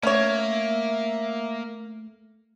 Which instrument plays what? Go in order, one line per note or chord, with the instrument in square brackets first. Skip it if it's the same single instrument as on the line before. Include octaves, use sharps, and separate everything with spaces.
[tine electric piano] A3 [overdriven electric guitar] A#3 [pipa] C#4 C#5 [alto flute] E5